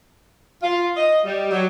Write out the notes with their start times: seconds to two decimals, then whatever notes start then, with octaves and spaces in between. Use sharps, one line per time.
0.63 F4
0.97 D#5
1.25 G3
1.52 F#3